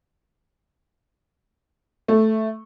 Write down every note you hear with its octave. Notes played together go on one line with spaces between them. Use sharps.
A3